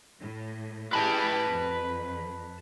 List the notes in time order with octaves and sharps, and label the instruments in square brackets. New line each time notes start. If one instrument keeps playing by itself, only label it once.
[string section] A2
[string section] E4 G4 G#4 [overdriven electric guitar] B4 A5
[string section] F2